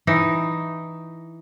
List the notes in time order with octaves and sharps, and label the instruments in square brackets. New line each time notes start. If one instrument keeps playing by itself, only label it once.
[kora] E3 D#4